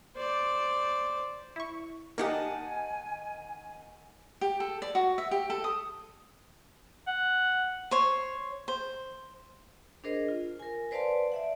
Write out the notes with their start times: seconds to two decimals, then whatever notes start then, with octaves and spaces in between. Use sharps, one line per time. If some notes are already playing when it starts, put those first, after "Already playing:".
0.16 C5 D5
1.56 E4 C#6
2.18 D#3 A#3 D#4 G4 F#5 G#5 A5
4.41 G4
4.60 A4
4.82 D5
4.95 F#4
5.18 E5
5.31 G4
5.50 A4
5.64 D#6
7.07 F#5
7.91 C5 C#5
8.68 C5
10.04 D4 G#4 A#4 C5 D#5
10.28 F4
10.60 A#4 G#5
10.91 B4 C5 D5 F5 A5 C6
11.32 D5 E5 F#5